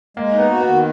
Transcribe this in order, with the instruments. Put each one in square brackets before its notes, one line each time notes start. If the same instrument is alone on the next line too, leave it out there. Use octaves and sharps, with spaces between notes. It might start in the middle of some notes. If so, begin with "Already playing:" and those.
[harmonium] G#3 [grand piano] A#3
[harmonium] D#4
[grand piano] B3
[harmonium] F#4
[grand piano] B3
[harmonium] D#3